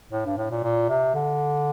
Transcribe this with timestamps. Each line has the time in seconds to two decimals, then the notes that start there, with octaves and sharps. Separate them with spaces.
0.12 A2
0.26 G2
0.38 A2
0.51 A#2
0.64 A#2
0.89 C3
1.14 D3